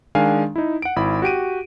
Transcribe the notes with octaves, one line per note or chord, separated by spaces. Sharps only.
D#3 G#3 D4 F5 G#5
D#4 E4
F#5 D7
G#1 E4 B5
F#4 G4 D7 D#7